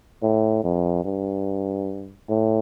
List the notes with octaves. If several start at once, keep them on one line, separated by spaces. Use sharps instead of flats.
A2
F2
G2
A2